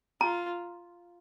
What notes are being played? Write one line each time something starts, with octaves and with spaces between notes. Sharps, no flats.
F4 A#5